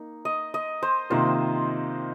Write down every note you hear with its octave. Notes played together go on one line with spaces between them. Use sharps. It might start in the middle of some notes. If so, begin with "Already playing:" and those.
Already playing: A#3 D#4
D#5
D#5
C5
C3 D#3 A#3 F4 C5